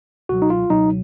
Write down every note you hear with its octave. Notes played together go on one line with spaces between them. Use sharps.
C#2 B2 F#3 F#4
D#4
F4
C#2 B2 F#3 D#4